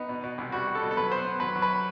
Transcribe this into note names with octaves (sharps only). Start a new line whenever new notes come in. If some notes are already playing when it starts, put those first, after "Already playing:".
Already playing: B3 D#4
B2
B2
C2
G3 F#4
G3
A4
B2
A4
F#3 B4
B3 C5
B3
F#3 B4
F#3
B4